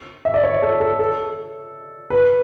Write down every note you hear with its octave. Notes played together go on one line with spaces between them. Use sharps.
E5
D5
C#5
A4
A4
A4
B4